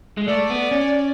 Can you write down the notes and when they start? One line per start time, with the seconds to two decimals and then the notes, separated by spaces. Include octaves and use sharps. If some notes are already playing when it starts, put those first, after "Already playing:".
0.17 G#3
0.27 A3 D5
0.50 B3
0.71 C#4